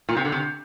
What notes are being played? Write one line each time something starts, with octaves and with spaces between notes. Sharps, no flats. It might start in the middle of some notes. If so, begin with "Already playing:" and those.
A#2
C3
D3
C3